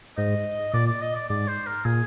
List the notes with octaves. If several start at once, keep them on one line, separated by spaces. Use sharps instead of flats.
G#2 D#5
A#2 D5
D5
D#5
D5
G#2 D5
C5
A#4
A#2 G#4